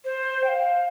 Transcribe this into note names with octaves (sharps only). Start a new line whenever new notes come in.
C5
G5
F5